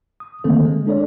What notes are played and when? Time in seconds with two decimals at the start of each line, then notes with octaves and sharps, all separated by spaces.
0.20 D#6
0.44 D3 D#3 A3 A#3 C4 A4
0.65 G#3
0.87 D4 A4 C#5 D5